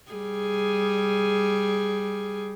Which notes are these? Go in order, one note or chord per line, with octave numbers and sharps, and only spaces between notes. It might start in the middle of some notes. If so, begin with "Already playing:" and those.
G3 G#4